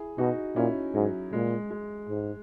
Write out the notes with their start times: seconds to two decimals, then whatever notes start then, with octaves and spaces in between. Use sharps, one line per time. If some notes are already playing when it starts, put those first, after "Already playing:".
Already playing: E4 G#4
0.18 B2 D#4 F#4
0.56 A#2 C#4 E4
0.94 G#2 F#3
1.33 A#2 G#3
1.70 G#3
2.09 G#2